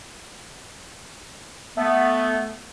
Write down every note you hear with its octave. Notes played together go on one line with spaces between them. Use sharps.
A3 B3